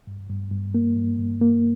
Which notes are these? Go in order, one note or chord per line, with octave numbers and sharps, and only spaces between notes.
G2
G2
G2
A#3
G2
G2
A#3